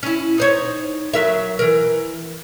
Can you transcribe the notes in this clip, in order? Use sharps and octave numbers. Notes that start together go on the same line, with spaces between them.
C#4 E4
D#4 C5 C#5
F#3 A#4 E5
E3 A#4